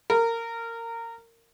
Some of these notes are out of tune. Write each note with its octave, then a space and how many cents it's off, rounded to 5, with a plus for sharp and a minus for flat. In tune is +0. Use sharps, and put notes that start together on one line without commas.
A#4 -20